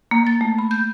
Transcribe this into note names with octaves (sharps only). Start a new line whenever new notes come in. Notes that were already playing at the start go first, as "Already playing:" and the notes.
A#3
A6
A3
B5
G6